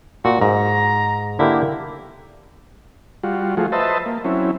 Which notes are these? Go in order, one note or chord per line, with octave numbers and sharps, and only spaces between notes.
A#2 F#4
G#2 A#5
D3 A#3 E4 G4
G3 F4 F#4
F3 A3 F4 F#4 G#4
B4 C5 D#5 E5 A5
A#3
F#3 C4 C#4 E4